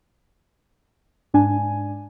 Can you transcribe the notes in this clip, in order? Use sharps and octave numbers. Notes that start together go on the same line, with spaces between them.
G#2 D4 G#5